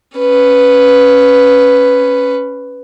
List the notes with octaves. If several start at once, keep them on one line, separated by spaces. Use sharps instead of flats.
C#4 B4